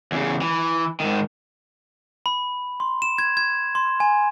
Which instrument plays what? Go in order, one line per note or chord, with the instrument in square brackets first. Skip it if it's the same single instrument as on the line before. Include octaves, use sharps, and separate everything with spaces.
[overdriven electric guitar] E2 C#3
E3
G#2 D#3
[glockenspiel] B5
C6
E7
G#6
G#6
C6
G#5